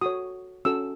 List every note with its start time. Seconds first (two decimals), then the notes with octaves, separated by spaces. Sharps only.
0.01 F#4 A4 C#5 D#6
0.65 C#4 F#4 A4 E6